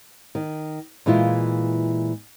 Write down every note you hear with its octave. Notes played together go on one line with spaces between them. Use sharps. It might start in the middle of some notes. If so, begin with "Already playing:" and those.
D#3
A#2 E3 G#3 E4 F4